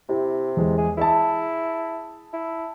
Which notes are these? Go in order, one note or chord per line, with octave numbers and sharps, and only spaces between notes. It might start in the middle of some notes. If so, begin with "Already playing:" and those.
C3 E4 G4
E2 G#3
G#4
E4 G#4 E5 A5
E4